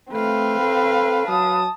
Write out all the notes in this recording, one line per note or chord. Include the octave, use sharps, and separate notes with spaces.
A3 C4 B4 F5
A4
F#3 A5 D#6